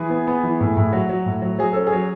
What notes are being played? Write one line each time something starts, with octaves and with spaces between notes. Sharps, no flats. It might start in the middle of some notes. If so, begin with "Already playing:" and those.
Already playing: E3 G#4
B3
B3
E3
A2
A2
F#3 F#4
F#3
A2
F#3
F#3 G#4
C#4 A4
G#4
F#3